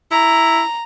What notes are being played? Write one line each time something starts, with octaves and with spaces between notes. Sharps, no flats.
E4 A#5